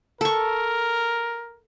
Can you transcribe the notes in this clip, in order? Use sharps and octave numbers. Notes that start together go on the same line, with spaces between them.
A4 A#4 C#6